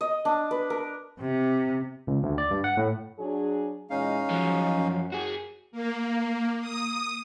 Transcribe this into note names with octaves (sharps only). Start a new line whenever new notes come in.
D#5
D4
B4
A#4
C3
C#2
D2
D5
G2
F#5
A2
F#3 D4 G#4
E2 A#2 G#3 C#4 D#4 F5
G#2 F3 F#3 G#3
F#2
F#4 G#4
A#3
D#6